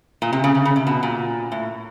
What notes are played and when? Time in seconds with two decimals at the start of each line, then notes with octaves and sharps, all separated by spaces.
0.22 A#2
0.33 C3
0.44 C#3
0.55 C#3
0.65 C#3
0.76 C3
0.87 B2
1.03 A#2
1.52 A2